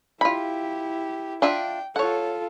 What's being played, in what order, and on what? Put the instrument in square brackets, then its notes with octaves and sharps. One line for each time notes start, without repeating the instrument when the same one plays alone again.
[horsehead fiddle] E4 G4 [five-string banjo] F4 B5
[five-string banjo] D4 F4 E5 [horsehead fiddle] G5
[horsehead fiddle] F4 A4 [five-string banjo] C#5 F#5